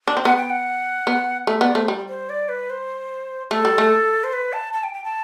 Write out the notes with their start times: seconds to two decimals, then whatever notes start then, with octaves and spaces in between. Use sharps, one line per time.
0.07 D4
0.17 C4
0.25 B3 F#5
0.37 G5
0.50 F#5
1.07 B3
1.47 A3 E5
1.61 B3 D5
1.75 A3 C5
1.88 G3
2.09 C5
2.29 D5
2.49 B4
2.70 C5
3.51 A3 A4
3.65 G3
3.78 A3
4.24 C5
4.33 B4
4.53 A5
4.73 A5
4.83 G5
4.94 G5
5.04 A5